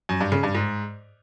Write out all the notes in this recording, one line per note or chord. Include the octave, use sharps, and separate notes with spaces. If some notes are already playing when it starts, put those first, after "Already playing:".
F#2
G2
C#3
G2
G#2